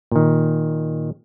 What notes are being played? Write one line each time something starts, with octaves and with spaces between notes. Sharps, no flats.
A#2 D#3